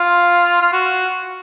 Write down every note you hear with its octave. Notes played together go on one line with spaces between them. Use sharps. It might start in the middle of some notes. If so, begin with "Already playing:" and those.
Already playing: F4
F4
F#4